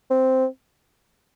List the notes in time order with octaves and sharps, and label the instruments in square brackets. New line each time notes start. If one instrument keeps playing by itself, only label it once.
[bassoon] C4